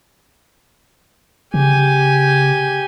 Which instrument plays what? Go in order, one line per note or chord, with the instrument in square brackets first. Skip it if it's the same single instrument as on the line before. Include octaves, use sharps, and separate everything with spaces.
[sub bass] C#3 [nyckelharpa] G4 G#5